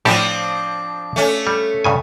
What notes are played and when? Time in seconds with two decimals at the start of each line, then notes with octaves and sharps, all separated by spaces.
0.05 A2 F3 C4 D4 G4 A4
1.16 A3 C#4
1.47 G3
1.84 G2 C#3 G#5